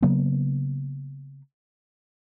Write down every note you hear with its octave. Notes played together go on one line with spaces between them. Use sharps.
C#3 F#3 A#3 B3